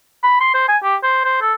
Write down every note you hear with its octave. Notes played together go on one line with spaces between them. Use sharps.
B5
C6
C5
G#5
G4
C5
C5
A4